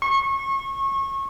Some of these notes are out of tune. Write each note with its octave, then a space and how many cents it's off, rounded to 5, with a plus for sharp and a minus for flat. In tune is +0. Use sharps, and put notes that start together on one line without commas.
C#6 -30